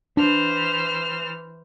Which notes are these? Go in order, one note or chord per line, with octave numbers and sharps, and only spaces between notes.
E3 D4 C5 F6